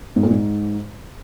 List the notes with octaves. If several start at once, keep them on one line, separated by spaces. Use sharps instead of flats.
G#2
A#2
G#2